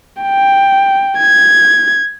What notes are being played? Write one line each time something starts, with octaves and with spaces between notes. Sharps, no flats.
G5
G#6